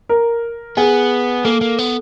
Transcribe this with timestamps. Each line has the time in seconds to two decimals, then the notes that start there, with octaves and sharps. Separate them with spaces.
0.09 A#4
0.77 B3 G#4
1.45 A#3 A4
1.61 A#3
1.79 B3